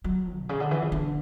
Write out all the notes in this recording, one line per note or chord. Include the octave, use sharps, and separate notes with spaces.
F#3
B2
C#3
D3
E3
C#3
D3